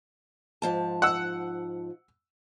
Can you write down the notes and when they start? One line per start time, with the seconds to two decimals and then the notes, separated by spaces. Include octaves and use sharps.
0.62 G#2 F3 A5
1.02 F#5 E6